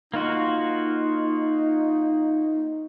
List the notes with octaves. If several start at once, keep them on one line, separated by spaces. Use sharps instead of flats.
A#3 D#4 F4 F#4